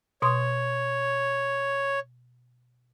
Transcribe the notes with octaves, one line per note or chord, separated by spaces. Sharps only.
B2 C#5 C6 D#6